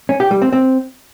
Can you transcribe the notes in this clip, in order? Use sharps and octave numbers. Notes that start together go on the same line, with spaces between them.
C#4
G4
G3
C4
C4